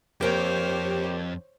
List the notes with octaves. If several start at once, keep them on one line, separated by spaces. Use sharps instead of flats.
F2 A#3 G4 A#4 C5 C#5 G5